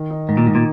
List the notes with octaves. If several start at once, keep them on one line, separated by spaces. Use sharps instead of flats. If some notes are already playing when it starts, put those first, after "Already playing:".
Already playing: D#3
D#4
G#2 D#3
A#2
G#2 D#4
A#2